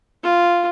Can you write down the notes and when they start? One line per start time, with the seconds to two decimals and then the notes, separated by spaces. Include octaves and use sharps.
0.23 F4